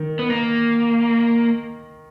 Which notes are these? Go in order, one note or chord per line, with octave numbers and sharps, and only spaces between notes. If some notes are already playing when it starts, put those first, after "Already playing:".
Already playing: D#3
B3
A#3